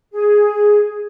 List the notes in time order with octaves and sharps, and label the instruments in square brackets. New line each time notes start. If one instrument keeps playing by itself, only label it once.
[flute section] G#4